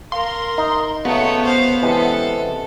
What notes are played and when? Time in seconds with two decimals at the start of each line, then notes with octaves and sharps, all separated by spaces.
0.12 A#4 F5 C6
0.58 D#4
1.05 C#3 F#3 A3 B3 C#5
1.45 C5 F5
1.82 C3 E3 G#3 C#4 A4